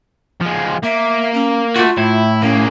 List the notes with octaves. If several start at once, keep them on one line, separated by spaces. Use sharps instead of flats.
F3 G#3
A#3 E5
C#4
A3 F4 F#4
A2 E4
A#3 C#4 G#4